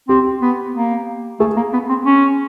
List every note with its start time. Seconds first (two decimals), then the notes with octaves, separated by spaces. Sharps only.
0.09 C4 G4
0.42 B3
0.75 A#3
1.40 A3 G#4
1.56 A#3
1.73 B3
1.89 C4
2.06 C#4